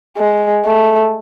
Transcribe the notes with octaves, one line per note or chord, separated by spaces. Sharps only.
G#3
A3